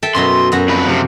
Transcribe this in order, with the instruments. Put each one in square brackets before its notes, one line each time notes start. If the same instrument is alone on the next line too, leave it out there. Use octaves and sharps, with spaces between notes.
[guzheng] A4 E5 G5
[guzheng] F#2 B2 F#3 [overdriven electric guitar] C6
[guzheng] F#2 F#4 A#5
[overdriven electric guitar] F2 B4
C3 F3